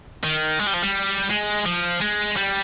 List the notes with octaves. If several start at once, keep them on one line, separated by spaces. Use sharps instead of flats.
D#3
G#3
G3
F3
G3
G#3
F3
G#3
G3